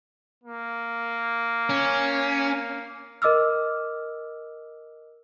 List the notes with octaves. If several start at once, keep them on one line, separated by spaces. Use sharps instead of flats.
A#3
C#4
A#4 D#5 D6 E6 F6